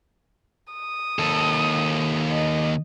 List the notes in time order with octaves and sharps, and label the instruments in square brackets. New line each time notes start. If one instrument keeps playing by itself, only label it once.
[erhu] D#6
[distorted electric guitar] D#2 A4
[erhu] D#5